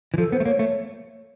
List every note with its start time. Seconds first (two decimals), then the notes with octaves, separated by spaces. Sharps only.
0.14 E3
0.18 F3 A4
0.32 B3 C5
0.40 A3
0.45 A#3 C#5
0.59 A3 C#5